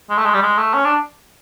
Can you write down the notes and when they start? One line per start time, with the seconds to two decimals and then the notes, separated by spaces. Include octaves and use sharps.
0.10 G#3
0.18 A3
0.25 G#3
0.34 G3
0.42 G#3
0.58 A3
0.74 C#4
0.85 D4